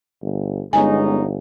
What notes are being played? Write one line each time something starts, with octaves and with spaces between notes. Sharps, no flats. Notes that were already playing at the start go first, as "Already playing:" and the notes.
G1
G1 G#3 B3 C#4 D#4 G#5